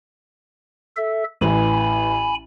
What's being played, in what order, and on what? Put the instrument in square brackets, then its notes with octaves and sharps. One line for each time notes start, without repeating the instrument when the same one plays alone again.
[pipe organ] A4 E5
[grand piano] A1 E3 [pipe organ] G#5 B5